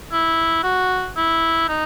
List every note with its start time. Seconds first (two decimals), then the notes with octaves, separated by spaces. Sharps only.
0.12 E4
0.64 F#4
1.17 E4
1.69 D#4